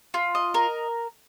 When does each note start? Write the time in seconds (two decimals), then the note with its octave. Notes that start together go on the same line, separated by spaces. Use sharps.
0.14 F4
0.35 D#5
0.54 A#4